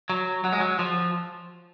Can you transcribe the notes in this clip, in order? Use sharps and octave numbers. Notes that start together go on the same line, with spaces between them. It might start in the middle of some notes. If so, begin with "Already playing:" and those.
F#3
F#3
G#3
F#3
F3